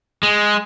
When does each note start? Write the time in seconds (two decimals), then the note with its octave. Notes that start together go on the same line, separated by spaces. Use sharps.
0.23 G#3